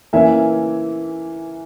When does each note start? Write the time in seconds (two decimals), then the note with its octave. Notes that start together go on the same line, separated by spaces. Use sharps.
0.13 E3 A#3 C#4 E5 G#5